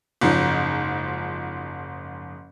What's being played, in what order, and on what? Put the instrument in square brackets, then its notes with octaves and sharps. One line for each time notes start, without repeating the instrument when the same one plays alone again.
[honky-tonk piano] F#1 G#2 F3